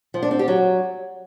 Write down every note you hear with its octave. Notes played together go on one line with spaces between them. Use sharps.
F3
D4
C4
G4
F#3